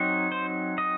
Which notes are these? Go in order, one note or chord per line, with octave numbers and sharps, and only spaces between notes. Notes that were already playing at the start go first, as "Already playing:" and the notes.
Already playing: F#3 C4 D#4
C5
D#5